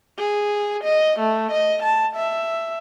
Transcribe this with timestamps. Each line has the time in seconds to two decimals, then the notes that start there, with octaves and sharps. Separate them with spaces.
0.18 G#4
0.84 D#5
1.19 A3
1.52 D#5
1.83 A5
2.16 E5